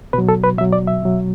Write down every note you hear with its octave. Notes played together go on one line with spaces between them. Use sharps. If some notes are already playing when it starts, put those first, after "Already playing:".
B2 F#3 B4
A4
B4
B2 F#3 E5
D5
E5
B2 F#3